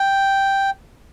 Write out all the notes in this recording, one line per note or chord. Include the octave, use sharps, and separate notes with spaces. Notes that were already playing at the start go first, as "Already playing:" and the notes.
Already playing: G5